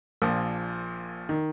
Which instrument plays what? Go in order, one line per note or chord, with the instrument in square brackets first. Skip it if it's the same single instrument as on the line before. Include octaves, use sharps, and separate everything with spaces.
[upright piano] A#1 A#2 F3
D#3